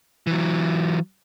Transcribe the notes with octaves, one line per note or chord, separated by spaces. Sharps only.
E3 F#3